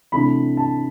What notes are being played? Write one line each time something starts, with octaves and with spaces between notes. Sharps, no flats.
C3 E3 A3 D4 B5
A5